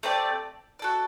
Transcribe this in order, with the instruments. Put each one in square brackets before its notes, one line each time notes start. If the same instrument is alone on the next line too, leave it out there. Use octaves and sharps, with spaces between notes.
[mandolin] A3 C4 G4 D5
F#4 A4 D5